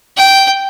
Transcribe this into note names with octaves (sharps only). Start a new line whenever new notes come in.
G5